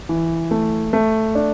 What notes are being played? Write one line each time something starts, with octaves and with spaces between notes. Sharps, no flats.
E3
A3
A3
D4